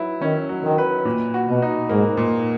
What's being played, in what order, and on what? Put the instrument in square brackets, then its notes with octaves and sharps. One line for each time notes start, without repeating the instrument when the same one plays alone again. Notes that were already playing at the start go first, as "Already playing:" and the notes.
Already playing: [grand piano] F#3 E4 B4
[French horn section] D#3 [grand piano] C#4
[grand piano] F#3
[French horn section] D#3
[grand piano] B4
A#2
F#4
[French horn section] B2
[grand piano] D#4
[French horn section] G#2 [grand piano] A#3
[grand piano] A#2